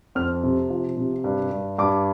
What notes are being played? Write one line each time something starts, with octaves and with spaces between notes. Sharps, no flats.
F2 F6
C3
F3
C3
G2
G2
G2 D6